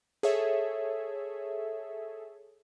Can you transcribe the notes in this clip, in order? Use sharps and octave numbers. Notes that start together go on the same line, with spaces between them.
G#4 A4 C#5 E5